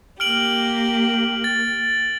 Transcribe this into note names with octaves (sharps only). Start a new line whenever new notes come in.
A#3 G4 F6 D7 F#7
A6